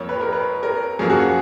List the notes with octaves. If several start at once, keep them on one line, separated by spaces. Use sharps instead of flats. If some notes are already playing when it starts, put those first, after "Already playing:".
Already playing: F2 F3 A#3 C#5
B4
A#4
B4
A#4
F#2 F3 A#3 G#4
F#4
G#4